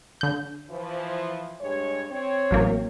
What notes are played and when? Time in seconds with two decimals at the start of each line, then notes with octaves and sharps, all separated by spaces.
0.21 D3 G6
0.70 E3 F3
1.61 G2 G#3 C#5
2.10 C4 C#5
2.51 A1 F#3 A#3